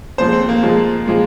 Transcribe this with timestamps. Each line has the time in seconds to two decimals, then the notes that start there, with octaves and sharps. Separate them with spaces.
0.18 A#2 F3 G#3 C5
0.33 C4
0.49 A#3
0.63 A#2 F3 G#3
1.08 A#2 F3 G#3